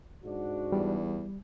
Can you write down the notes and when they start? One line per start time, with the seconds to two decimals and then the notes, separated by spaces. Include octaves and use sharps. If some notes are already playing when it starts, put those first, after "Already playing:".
0.23 G#2 D4 F#4
0.72 E2 G3